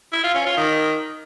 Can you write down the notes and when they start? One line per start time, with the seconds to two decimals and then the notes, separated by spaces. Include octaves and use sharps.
0.13 E4
0.24 F4
0.35 C#4
0.46 F4
0.57 D#3